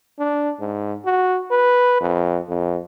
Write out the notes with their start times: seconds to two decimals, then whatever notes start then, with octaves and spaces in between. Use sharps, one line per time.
0.19 D4
0.60 G#2
1.05 F#4
1.51 B4
2.00 F2
2.49 F2